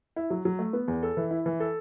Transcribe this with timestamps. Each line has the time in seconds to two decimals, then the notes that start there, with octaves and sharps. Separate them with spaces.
0.16 E4
0.30 F#3
0.45 F#3
0.59 A3
0.73 B3
0.88 E2
1.03 A4
1.17 E3
1.31 E4
1.46 E3
1.60 A4